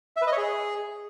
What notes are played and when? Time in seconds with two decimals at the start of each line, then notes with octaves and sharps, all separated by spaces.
0.17 E5
0.22 B4
0.27 D#5
0.32 C#5
0.38 G#4